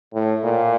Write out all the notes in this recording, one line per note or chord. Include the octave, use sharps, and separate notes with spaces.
A2
A#2